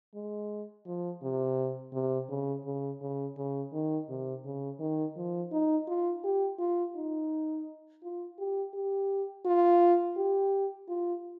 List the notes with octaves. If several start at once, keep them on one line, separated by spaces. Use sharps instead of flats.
G#3
F3
C3
C3
C#3
C#3
C#3
C#3
D#3
C3
C#3
D#3
F3
D#4
F4
G4
F4
D#4
F4
G4
G4
F4
G4
F4